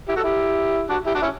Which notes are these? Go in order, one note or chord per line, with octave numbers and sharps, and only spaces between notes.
E4 G4
F#4 A4
E4 G4
D4 F#4
E4 G4
D4 F#4
C#4 E4